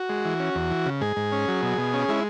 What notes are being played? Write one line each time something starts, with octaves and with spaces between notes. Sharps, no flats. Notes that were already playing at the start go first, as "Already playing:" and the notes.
Already playing: F#4
G#3
E3
C#4
E2
E3
C#3
G#2 G#4
G#2
C#4
F#3
B2
B2
C#4
G#3 E4